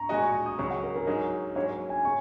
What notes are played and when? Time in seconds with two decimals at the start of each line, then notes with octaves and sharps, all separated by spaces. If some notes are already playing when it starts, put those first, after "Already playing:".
Already playing: A#5 C#6
0.09 A#2 G#3 F#4 D#5 G#5
0.22 C#6
0.46 D#6
0.58 C#2 C#3 F#3 C#6
0.71 F#5
0.83 A#4
0.95 A#4
1.07 G#2 F#3 D#4 G#4 D#5
1.56 G#2 F#3 A#3 C#4 C#5
1.89 G#5
2.05 C#3 C#6